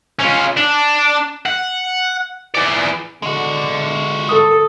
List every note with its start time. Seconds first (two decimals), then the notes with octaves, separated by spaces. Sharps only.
0.19 C#4 F4
0.57 D4
1.46 F#5
2.55 E3 D5
3.22 D3 G#3 F#4
4.29 A4 D#6